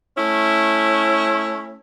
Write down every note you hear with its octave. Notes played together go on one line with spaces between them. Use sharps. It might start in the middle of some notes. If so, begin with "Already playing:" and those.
A3 C#4 E4